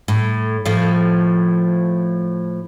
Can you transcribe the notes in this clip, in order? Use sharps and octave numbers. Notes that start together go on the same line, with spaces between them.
A2
A2 F3